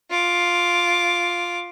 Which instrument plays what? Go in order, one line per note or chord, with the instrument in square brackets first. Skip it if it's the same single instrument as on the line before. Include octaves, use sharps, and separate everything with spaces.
[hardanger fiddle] F4 D6